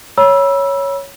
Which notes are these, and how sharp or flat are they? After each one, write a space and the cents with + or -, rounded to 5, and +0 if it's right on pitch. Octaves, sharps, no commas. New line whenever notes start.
C#5 +0 B5 -35 E6 +5